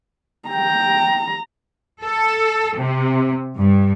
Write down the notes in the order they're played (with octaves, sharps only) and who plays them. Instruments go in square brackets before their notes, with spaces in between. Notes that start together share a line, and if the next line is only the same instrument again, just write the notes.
[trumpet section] G5 [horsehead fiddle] A#5
[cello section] A4
C3
G2